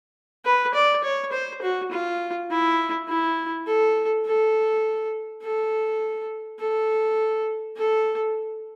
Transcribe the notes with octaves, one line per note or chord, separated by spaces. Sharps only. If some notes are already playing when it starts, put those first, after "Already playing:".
B4
D5
C#5
C5
F#4
F4
E4
E4
A4
A4
A4
A4
A4